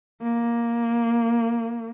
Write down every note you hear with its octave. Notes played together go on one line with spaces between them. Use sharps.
A#3